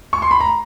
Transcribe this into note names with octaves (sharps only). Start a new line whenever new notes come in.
C#6
C6
B5
A#5